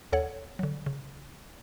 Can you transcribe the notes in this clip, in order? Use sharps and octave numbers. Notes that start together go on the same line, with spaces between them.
D#2 A4 C#5 F#5
D3 F#3
C#3